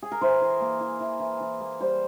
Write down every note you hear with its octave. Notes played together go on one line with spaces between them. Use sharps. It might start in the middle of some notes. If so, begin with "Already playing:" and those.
G#4
A#4
E3 C5
E3
A#3
E3
E3
E3
E3
A#3
G3 C5